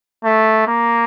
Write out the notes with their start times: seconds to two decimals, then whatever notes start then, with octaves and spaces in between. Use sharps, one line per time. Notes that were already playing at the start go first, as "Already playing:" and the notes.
0.24 A3
0.68 A#3